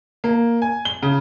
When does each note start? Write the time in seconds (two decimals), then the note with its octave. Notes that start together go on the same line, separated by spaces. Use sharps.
0.24 A#3
0.62 G#5
0.85 G7
1.02 C#3